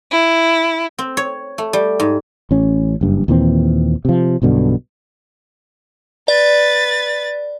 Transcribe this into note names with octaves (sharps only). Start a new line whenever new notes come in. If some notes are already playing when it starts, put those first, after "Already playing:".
E4
C4
C#5
A3
G3
G#2
A1 C#4
F#1 G2
D#2 A#2 E3 C4
C3 F3
B1 G2 B2 D3
B4 D5 A6